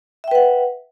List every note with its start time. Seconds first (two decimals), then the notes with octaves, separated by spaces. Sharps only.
0.24 E5
0.28 G5
0.31 B4
0.35 F#5